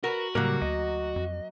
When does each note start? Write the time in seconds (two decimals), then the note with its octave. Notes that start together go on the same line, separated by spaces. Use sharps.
0.04 F#4 A#4 B4
0.35 A2 C#3 F#3 G3 A#3 A#4
0.62 D2 D#5
1.16 F2